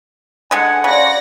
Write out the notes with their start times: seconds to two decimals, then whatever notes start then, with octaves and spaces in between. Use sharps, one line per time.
0.51 D3 G#3 F#5 G#5
0.84 C#3 F#4 C5 D5 G#5 A#6